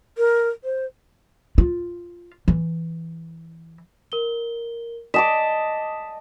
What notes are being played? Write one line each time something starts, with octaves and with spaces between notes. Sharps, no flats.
A#4
C5
F4
E3
A#4 G7
D#5 A5 D6 B6 E7